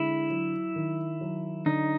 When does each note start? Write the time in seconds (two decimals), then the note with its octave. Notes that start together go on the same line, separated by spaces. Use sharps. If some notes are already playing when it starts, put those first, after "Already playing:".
Already playing: D3 G#3 E4
0.30 F#3
0.76 D#3
1.21 F#3
1.66 D3 D#4